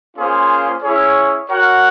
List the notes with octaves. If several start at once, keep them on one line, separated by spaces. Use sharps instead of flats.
A#3 C#4 F4 G#4 C5
C#4 E4 G#4 C#5
F#4 A#4 C#5 F#5